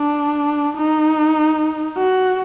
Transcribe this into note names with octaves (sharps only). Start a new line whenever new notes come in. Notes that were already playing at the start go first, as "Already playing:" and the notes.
Already playing: D4
D#4
F#4